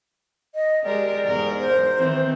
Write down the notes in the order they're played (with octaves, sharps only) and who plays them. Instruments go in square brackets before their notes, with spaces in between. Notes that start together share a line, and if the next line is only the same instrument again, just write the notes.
[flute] D#5
[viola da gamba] G#3 G4 A#4 [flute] D5
[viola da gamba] E2 G#2 A#4
[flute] C5
[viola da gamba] D#3 E3 C4